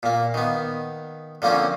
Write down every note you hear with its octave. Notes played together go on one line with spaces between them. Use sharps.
A#2 A#3
D#3 B3
D3 F3 A#3 C4 C#4